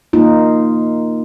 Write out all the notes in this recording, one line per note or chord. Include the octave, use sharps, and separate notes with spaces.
A#3 D#4 F4